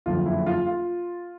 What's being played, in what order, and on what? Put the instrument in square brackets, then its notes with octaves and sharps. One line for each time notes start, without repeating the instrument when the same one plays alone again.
[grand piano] F#1 F2 D3 F4
E4
F4
F4